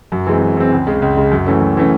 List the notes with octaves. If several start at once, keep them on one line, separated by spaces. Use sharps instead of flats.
F#2
E3 G#3 C4
F#2
E3 G#3 C4
C#2
C#3 G#3
C#2
C#3 G#3
F#2
E3 A3 C#4
F#2
E3 A3 C#4